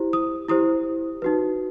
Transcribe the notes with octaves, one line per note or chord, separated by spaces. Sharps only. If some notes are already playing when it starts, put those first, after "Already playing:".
Already playing: E4 G4 C5
D#6
E4 G4 C5 D#6
D#4 F#4 B4